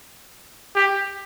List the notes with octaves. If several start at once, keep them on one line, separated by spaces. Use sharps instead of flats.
G4